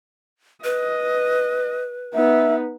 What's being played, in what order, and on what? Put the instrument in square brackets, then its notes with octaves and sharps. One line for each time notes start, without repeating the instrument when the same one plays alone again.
[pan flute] B4 [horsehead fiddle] D#5
[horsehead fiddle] B3 D#4 [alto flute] E5